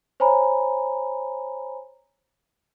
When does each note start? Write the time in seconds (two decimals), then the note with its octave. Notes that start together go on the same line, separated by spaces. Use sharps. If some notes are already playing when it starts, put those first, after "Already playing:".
0.20 C5 C#5 G#5 A#5 B5